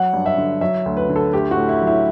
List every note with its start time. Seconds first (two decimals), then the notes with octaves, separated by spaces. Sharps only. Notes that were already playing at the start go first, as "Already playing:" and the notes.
Already playing: F#3 F#5
0.14 G2
0.26 E5
0.38 D3
0.61 F#3 E5
0.86 D2
0.97 B4
1.09 D3
1.16 A4
1.33 A3 G4
1.51 F#4
1.57 A2
1.69 E4
1.81 F#3
1.87 E4